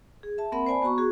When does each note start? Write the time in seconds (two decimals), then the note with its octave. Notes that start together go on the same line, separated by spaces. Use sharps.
0.23 G#4
0.38 E5 A5
0.52 A#3 C4 A#4 E5 F#5 B5
0.66 C5 D5 G#5 A5 B5
0.82 B3 F#4 A#5 C#6
0.98 F#4 G#4